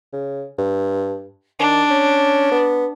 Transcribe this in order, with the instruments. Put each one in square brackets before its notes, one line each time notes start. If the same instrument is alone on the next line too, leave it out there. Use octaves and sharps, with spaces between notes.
[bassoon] C#3
G2
[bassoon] D#3 [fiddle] D4
[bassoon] C#4
B3